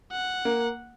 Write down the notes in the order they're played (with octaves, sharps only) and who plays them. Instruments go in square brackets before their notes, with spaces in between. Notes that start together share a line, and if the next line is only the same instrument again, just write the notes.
[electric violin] F#5
[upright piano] A#3